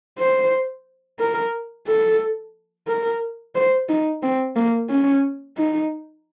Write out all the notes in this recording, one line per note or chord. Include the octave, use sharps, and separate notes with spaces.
C5
A#4
A4
A#4
C5
D#4
C4
A#3
C#4
D#4